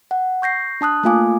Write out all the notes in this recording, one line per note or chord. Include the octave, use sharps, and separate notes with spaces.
F#5
C#6 G6 A#6 C7
D4 A5 D#6 F#6
A3 A#3 F4 F5 G#5 D6